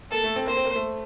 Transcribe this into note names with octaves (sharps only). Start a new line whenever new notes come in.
A#3 A4
A3
C4
A#3 C5
C4
A#3
A3